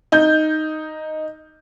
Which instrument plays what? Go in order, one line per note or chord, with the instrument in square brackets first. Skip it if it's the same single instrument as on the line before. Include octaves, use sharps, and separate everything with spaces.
[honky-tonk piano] D#4 G6